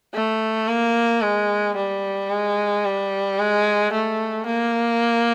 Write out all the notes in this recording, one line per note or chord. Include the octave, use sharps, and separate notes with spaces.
A3
A#3
G#3
G3
G#3
G3
G#3
A3
A#3